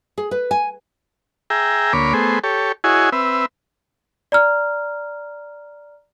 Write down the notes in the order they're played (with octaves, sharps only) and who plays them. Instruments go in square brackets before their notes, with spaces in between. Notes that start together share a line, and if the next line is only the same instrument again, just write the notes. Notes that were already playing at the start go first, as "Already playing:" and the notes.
[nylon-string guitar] G#4
B4
G#5
[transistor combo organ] G#4 E5 G5 A#5
D2 A#3 C#5 B5 D6
A3 B3 G#4 C5
G4 A4 C#5
E4 F#4 G#4 C#5 D#5 G#5
C4 B4 E5
[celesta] D5 A#5 F6